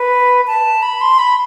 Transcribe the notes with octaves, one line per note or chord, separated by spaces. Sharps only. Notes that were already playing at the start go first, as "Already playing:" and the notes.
Already playing: B4
A5
B5
C6
B5